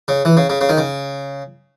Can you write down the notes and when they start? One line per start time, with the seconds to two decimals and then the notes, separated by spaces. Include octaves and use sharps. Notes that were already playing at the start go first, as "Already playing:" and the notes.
0.08 C#3
0.25 E3
0.37 C#3
0.50 C#3
0.61 C#3
0.69 D#3
0.77 C#3